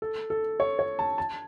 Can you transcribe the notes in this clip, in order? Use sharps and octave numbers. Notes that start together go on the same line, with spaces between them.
A4
A4
C#5
C#5
A5
A5